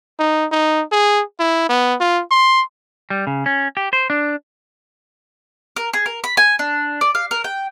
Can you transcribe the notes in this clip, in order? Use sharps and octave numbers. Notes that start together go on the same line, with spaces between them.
D#4
D#4
G#4
E4
B3
F4
C6
G3
C#3
C#4
G4
C5
D4
A#4
G#4
A#4
B5
G#5
D4
D5
F5
A#4
G5